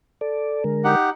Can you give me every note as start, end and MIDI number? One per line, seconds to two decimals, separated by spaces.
0.21 0.64 69
0.21 0.64 74
0.64 0.96 50
0.64 0.96 56
0.64 0.96 70
0.84 1.10 63
0.84 1.10 67
0.84 1.10 78